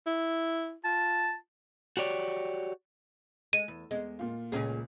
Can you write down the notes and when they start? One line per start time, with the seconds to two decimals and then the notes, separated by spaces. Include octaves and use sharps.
0.07 E4
0.84 F4 A5
1.97 F#4 G4 C#5 D5
3.53 G#3 D#7
3.68 E2
3.91 E2 G#3
4.19 A#2 F4
4.52 C#2 A#2 C#4 G#4